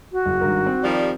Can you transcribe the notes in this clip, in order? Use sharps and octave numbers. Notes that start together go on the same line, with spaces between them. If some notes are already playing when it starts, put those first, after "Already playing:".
F#4
F#1
G#1 G2 A#4
C4
D#3 F3 G3